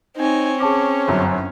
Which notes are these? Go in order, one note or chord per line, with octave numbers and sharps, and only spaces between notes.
C4 D#4 C#5 G#5
C#4 G#4 A5 D6
G1 F#2